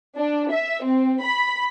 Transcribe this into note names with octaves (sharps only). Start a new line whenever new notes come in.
D4
E5
C4
B5